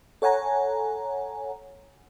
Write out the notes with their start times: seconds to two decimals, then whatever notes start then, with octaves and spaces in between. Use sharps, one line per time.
0.22 A4 C#5 F#5 G#5 A#5